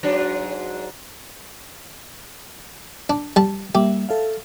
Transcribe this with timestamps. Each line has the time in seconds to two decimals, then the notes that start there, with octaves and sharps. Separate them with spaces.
0.03 G#2 F#3 D4
3.10 D4
3.36 G3 A5
3.75 G3 A#3 G4 E5
4.09 A4 E5 F5